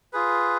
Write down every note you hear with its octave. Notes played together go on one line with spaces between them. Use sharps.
F4 G#4 B4